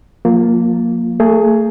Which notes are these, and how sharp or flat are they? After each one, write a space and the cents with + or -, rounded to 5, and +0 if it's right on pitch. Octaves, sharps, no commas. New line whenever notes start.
F3 +40 A#3 +0 F4 +0
A3 +40 G#4 +10